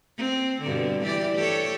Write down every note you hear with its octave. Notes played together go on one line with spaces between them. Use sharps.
C4
G2 B2 D3
E3 G4 D5
G4 A4 C#5